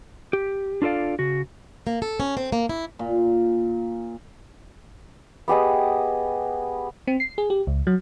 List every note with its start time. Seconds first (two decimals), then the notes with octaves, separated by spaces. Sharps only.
0.33 G4
0.82 D4 F4 A4 D5 F5
1.19 C#3 F#4
1.87 A#3
2.02 A4
2.20 C#4
2.37 C4
2.52 A#3
2.69 E4
2.99 A#2
5.48 B3 G4 G#4 D#5
7.07 C4
7.20 C7
7.38 G#4
7.50 G4
7.67 C#2
7.87 F#3